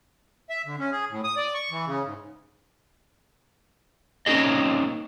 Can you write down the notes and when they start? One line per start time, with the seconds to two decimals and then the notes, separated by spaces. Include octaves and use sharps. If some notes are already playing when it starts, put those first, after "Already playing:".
0.50 E5
0.66 D3
0.79 C#4
0.92 G#4
1.10 A2
1.24 D#6
1.37 D5
1.54 C#6
1.71 E3
1.86 C#3
2.05 G#2
4.26 A#3 C4 C#4 D#4 G#4 D#5